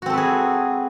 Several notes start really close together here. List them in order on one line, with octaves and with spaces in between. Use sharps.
F#4 C4 A4 B4 G#4